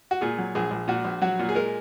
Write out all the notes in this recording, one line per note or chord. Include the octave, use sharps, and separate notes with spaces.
F#4
A#2 G#4
F#3
A#1 G#4
A#1
A#2 F#4
A#1
F#3 F#4
A#2
G#4
G#3 A#4